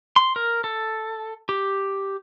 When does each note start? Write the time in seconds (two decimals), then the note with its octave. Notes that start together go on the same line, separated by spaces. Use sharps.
0.16 C6
0.36 A#4
0.64 A4
1.49 G4